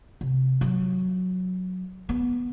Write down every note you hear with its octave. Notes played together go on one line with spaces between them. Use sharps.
C3
F#3
B3